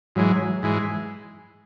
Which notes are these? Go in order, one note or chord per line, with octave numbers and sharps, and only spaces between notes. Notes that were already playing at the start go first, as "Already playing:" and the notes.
G#2 E3 F#3 G#3
G#2 E3 G#3